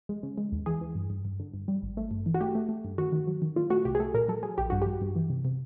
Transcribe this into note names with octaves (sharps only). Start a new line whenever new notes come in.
G#3
C#3
G#3
D#2
E3 G#4
E3
G2
G2
G2
D3
G2
G3
G#1
A3
G2
E3
F#4
A3 G4
A3
A3
G2
D#3 F#4
D#3
F#3
D#3
A#2 F4
A3 F#4
C2 G4
G#4
A3 A4
A#2 A#4
F#3 A4
F#3 G#4
A#1 G4
G2 F#4
G2 G4
G2
E3
C3
C3